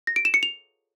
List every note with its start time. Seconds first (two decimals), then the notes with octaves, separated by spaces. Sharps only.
0.07 A#6
0.16 D7
0.25 E7
0.34 C#7
0.43 F7